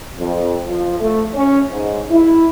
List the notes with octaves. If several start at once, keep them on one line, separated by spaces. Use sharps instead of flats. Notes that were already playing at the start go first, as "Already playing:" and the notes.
F2
F3
A3
C#4
G#2
E4